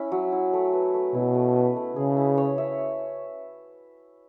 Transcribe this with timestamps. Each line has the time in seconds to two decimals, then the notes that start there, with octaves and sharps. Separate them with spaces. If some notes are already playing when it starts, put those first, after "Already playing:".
Already playing: C#4 E4
0.12 F#3
0.32 E4
0.53 A3
0.73 B4
0.94 A3
1.14 B2 E4
1.35 A3
1.55 B4
1.76 A3
1.96 C#3 G#4
2.17 E4
2.38 C#5
2.58 E5